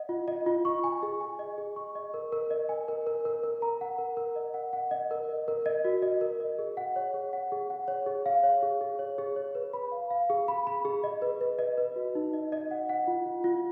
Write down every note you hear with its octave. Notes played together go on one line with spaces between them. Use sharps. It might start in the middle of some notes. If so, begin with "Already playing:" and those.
Already playing: D#5 F#5
F4
D#5
F4
C#6
G#5
G#4
G#5
D#5
G#4
C#6
D#5
A#4
A#4
D#5
G#5
A#4
A#4
A#4
A#4
A#5
F#5
A#4
A#4
D#5
F#5
F#5
D#5
A#4
D#5
A#4
D#5
F#4
D#5
A#4
D#5
G#4
F#5
C#5
G#4
F#5
G#4
F#5
C#5
G#4
F5
C#5
G#4
G#4
C#5
G#4
C#5
B4
B5
F5
F5
G#4
B5
B5
G#4
D#5
B4
B4
D#5
B4
F#4
D#4
D#5
D#5
F#5
F#5
F4
F4
F4